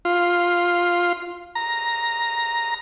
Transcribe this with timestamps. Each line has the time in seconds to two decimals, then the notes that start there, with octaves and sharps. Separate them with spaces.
0.05 F4
1.55 A#5